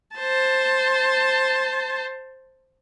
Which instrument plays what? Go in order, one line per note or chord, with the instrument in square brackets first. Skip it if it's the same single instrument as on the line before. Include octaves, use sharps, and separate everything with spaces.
[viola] C5 A5